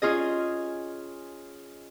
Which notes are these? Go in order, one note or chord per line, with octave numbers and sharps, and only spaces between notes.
C#4 F4 G#4 D#5